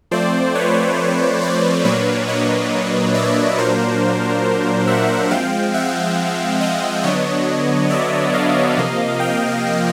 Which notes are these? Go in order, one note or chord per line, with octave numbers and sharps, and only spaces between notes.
F3 A3 C4 C5 D5
B4 C#5
C5 D5
A#2 F#3 A#3 D4 B4 C#5
C#5 D#5
D5 E5
A#2 F#3 A#3 D4 A#4 C5
E5 F#5
F3 G#3 C4 F5 G5
E5 F#5
D#5 F5
D3 F#3 B3 D4 C#5 D#5
D5 E5
D#5 F5
C3 F3 A#3
F5 G5